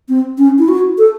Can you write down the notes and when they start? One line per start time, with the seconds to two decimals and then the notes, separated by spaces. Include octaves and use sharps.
0.09 C4
0.38 C#4
0.59 E4
0.68 F#4
0.98 A4